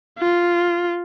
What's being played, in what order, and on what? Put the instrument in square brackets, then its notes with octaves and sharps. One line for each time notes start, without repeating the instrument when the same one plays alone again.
[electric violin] F4